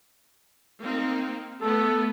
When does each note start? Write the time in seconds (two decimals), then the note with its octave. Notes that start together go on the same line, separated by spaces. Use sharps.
0.81 A#3 C4 D#4
1.61 A3 B3 A4